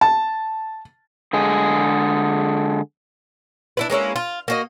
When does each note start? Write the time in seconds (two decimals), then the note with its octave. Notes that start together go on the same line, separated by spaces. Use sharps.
0.01 A5
1.33 D3 G#3 G#4
3.77 D4 E4 B4
3.90 G#3 A#3 C#4 E4
4.16 F4
4.48 A#3 F#4 D#5